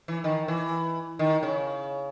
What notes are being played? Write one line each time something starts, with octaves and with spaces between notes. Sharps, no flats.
E3
D#3
E3
D#3
C#3